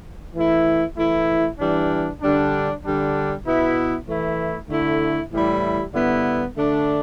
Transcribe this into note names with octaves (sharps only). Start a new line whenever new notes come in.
E3 A3 E4
E3 A3 E4
E3 G3 D4
D3 G3 D4
D3 G3 D4
B2 B3 E4
E3 A3 E4
D3 A3 E4
A2 E3 G3 E4
G2 D3 B3 E4
D3 A3 D4